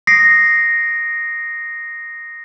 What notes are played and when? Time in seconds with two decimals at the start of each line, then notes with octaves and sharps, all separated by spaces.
0.07 D#6 A#6 C7 D7